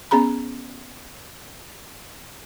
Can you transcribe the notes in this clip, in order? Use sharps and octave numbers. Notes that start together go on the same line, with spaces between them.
B3 C#4 G#4 A#5 B5